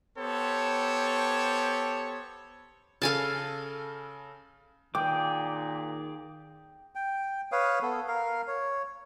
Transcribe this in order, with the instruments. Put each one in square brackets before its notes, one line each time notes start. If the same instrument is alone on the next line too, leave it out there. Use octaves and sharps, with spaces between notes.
[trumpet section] B3 G4 A4 C5 C#5
[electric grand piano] C#3 A4 [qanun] F5 G#5 A5
[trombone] A#2 [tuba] D#3 [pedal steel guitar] G#4 D6 [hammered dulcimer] G5
[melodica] G5
B4 C#5 F5 D#6
B3 A4
A#4 F5
C#5